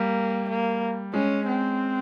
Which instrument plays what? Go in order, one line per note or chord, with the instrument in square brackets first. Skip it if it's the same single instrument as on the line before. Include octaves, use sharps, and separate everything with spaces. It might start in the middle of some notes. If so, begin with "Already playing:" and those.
Already playing: [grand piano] G3 [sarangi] A#3
[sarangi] A#3
[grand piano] G#3 [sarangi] C#4
[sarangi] C4